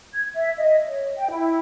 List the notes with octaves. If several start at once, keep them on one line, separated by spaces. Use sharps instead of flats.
G#6
E5
D#5
C#5
G5
E4